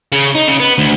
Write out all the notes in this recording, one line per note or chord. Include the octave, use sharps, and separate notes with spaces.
C#3
D#4
C#3
B3
D2